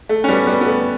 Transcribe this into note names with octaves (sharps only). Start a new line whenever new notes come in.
A3
C#4
G3 B3
G3 B3
B3
A3